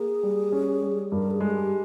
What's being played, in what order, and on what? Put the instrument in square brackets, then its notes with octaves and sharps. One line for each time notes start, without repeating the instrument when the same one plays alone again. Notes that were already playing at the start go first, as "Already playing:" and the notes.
Already playing: [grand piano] A#3 [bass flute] G#4
[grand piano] G3
C#4
G3
[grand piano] G2 [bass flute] A#4
[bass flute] G#4
[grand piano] G#3
[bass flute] G4